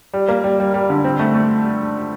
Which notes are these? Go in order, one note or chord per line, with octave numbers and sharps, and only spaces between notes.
G3
A#3
G3
G3
G3
D3
C4
A3
A3